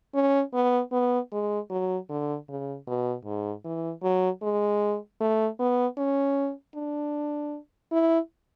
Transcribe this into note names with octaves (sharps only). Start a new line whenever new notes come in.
C#4
B3
B3
G#3
F#3
D3
C#3
B2
G#2
E3
F#3
G#3
A3
B3
C#4
D4
E4